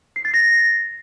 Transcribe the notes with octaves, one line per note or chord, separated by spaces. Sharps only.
C7
A6
A#6